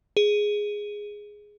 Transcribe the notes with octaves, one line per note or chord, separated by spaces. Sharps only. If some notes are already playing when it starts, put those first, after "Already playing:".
G#4